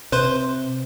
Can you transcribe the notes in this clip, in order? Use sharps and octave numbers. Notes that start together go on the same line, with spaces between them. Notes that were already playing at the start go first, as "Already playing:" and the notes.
C3 B4 C5 C6